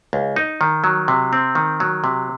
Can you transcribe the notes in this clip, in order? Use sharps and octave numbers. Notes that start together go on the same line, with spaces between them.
C#2
D#4
D#3
F#3
C3
C4
D#3
F#3
C3